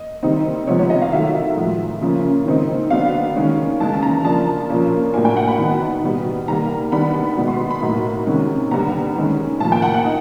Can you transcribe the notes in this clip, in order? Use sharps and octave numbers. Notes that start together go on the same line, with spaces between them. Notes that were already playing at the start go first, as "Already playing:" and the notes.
Already playing: D#5
D#3 G3 C4 D#4
C3 F3 G#3 B3 C#5
C#5
D#5
F5
D#3 F#3 A3 E5
A2 F3 G#3
C#3 F3 A#3 C#4
D#3 G#3 C4 D#4
D3 F#3 B3 D4 F5
D#3 G#3 C#4
C#3 E3 G#3 C#4 A5
A5
A#5
F3 A#3 D4 A5
A#2 F3 A#3 C#4
A2 F#3 A#3 D4 G#5
G5
F#5
B5
D#3 F#3 B3 D#4
B2 G3 B3
D#3 G3 A#3 A#5
D#3 G3 B3 D4 B5
B5
B2 G#3 B3 D#4 B5
C6
B5
A2 F#3 A#3 D#4
C3 D#3 G#3 C#4
D3 G3 B3 A#5
D#3 G#3 C#4
A2 F3 A#3 A5
G5
F#5
F#5
D#4